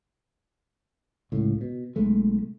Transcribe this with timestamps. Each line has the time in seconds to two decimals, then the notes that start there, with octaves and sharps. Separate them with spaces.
1.32 C#2 A2
1.61 B2
1.96 B1 G#3 A3